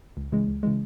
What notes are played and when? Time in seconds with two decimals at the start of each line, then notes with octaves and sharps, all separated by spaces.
0.17 C#2
0.32 C#3 E3 G#3
0.48 C#2
0.63 C#3 E3 G#3